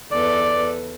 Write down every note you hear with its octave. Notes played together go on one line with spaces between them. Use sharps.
E2 A4 B4 D5